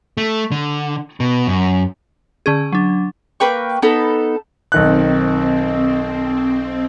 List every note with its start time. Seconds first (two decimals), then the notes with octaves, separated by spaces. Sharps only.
0.17 A3
0.52 D3
1.20 B2
1.47 F#2
2.46 D3 C#4 G#4
2.72 F#3 D4
3.40 A#3 B4 G5 C#6
3.82 B3 D#4 A4 B5
4.72 B1 D#3 C4 F#6